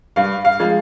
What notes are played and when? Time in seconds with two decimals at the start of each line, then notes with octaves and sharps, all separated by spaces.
0.16 G2 F5
0.45 F5
0.60 F3 G#3